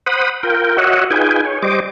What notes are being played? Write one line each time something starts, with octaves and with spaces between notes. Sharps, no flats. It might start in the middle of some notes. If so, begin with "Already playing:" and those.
C5 F#5 B5 D#6
F4 A#4 G5
F#4 C#5 D#5 E5 F#5
D#4 F4 G#4 B4 G5 G#5
C#5
G3 C5 D#5 D6